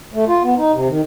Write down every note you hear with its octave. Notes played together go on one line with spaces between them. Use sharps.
A3
F4
B3
D#4
C3
D#3